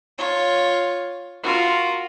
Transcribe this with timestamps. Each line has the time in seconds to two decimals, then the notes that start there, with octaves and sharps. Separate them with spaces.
0.18 F4 C#5
1.43 F4 F#4 A#4